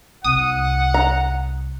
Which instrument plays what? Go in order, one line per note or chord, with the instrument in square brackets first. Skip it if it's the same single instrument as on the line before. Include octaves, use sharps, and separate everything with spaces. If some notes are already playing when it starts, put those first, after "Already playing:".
[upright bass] C2 [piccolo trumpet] F#5 [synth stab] D#6
[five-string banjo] A#5